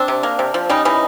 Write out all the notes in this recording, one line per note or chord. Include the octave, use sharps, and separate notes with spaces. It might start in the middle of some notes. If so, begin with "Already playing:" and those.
Already playing: C4 D4
C3
A#3
C3
F3
G3 C#4 D#4
E3 C#4 D#4